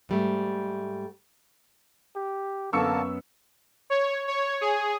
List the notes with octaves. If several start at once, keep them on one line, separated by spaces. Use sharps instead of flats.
G#2 G3 A3
G4
F#2 D3 A#3 B3 A5 C#6 E6 C#7
C#5
C#5
G#4